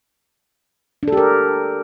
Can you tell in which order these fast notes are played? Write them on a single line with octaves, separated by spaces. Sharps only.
D4 A4 G4 A#4